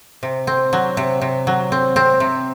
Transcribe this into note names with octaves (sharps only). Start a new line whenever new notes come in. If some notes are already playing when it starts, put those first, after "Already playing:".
C3
C4
F#3
C3
C3
F#3
C4
C4
C3